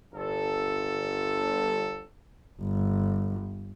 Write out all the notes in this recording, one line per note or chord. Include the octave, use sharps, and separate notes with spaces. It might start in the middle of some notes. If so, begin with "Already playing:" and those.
G1 A4
G1